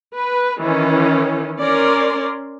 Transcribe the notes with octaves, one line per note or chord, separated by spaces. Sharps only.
B4
D#3 E3 C#4
C#4 A#4 D5 C6